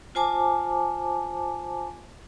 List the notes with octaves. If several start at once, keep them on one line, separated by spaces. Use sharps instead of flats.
F4 C5 G#5 A5 D6